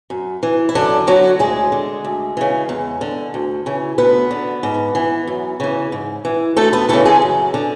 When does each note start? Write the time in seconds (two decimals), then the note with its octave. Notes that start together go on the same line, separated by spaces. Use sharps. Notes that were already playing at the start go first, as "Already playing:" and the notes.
0.10 F#2
0.43 E3
0.69 E4
0.75 F#2 D3 D4
1.07 D3 F#3 F#4
1.39 D2 G#3 G#4
1.72 D3
2.04 D2
2.37 C#3 E3
2.69 E2
3.01 D3
3.34 D2
3.66 C#3 E3
3.98 D2 B3 B4
4.31 D3
4.63 G#2
4.95 E3
5.27 F#2
5.60 C#3 E3
5.92 G#2
6.25 E3
6.56 D2 A3 A4
6.73 B3 B4
6.89 C#3 E3 A3 A4
7.05 G#3 G#4
7.22 F#2
7.54 D3